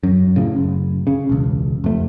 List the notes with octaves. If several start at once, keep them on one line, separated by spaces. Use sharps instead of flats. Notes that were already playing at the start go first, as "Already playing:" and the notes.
F#2
A2 C#3
F#1
C#3
E1 C#2
F2 A3